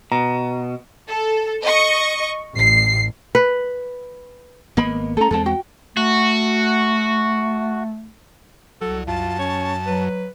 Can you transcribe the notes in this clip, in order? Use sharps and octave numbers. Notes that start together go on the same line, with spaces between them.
B2 A#5
A4
D#5 C#6
A1 C7
B4
G#1 A#3 B3 D#5 B5
A3 C#4 A4 A#5
E2 G#3 C4 A4 A5
F#4 G5
A3 F#4
C2 F#3 A4
F#2 F4 A5
C#4 C#5
F#3 B4